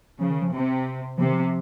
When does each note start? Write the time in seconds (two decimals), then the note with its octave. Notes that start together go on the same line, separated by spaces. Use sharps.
0.21 C#3 F3
0.31 D#3
0.42 F3
0.53 C3
1.18 C3 F3
1.26 D#3
1.33 F3